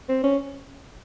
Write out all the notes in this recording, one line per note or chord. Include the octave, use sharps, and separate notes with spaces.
C4
C#4